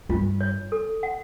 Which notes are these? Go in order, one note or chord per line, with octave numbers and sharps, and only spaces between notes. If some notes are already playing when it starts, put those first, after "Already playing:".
G2 F4
C#5
A4
F#5